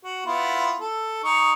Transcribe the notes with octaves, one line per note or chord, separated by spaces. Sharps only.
F#4
B3 E4 F4
A4
D#4 C#6